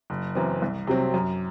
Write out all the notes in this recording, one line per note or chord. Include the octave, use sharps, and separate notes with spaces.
F#1
F#2 E3 C4
C2
C3 F#3 C4
F#2